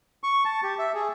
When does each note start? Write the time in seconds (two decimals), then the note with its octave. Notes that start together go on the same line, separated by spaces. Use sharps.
0.24 C#6
0.45 A5
0.63 G4
0.79 E5
0.94 G#4